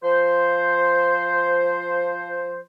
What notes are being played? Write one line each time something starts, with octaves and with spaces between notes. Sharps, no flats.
F3 C5